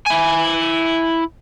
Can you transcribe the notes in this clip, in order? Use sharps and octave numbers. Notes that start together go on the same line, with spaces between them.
E4 G#5